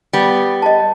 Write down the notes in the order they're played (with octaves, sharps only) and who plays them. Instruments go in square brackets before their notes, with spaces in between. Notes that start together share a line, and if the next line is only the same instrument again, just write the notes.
[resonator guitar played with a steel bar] G3 B3
[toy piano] D#5 A5